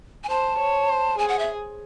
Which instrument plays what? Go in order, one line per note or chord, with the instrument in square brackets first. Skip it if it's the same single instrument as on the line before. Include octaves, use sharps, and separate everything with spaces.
[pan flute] G#5
[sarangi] C5 [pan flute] A5
[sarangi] C#5
C5
[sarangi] G#4 [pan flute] G#5
[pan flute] F#5
E5